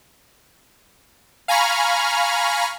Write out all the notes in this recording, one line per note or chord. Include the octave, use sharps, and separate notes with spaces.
F5 G#5 A#5 B5 C#6 F6